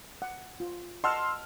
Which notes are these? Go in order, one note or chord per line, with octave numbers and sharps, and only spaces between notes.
F#5
F4
D#5 F#5 A5 C6 E6 F6